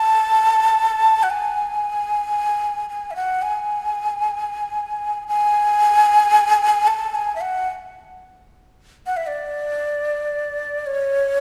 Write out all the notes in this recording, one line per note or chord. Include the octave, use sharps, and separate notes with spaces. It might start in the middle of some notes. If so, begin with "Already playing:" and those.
Already playing: A5
F#5
G#5
G#5
E5
F#5
G#5
G#5
A5
G#5
E5
F#5
F#5
E5
D5
C#5